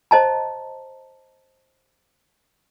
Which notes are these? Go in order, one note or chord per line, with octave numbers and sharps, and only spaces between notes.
C5 D#5 A5 A#5